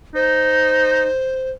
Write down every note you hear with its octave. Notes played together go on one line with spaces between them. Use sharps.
D#4 C5